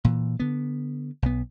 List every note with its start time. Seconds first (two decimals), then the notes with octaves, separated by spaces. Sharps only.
0.05 A#2 E3
0.40 D3 B3
1.22 B1 B3